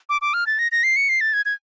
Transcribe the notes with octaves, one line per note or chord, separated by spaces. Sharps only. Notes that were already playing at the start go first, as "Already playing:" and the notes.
D6
D6
F6
A6
A#6
A#6
C7
C#7
C7
A6
G#6
G#6